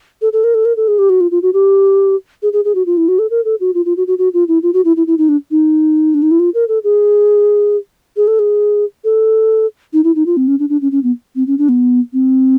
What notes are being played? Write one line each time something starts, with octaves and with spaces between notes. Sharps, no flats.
A4
A4
A#4
A4
A#4
A4
G#4
G4
F#4
F4
F4
F#4
G4
G#4
G#4
G#4
F#4
F4
E4
F#4
A4
A#4
A4
F#4
F4
F4
F#4
F#4
F#4
F4
E4
F4
F#4
E4
E4
E4
D#4
D4
D#4
D4
D#4
E4
F4
A#4
A4
G#4
G#4
A4
G#4
A4
D#4
E4
D#4
F4
C4
C#4
D4
D4
C#4
C#4
B3
C4
C#4
D4
B3
C4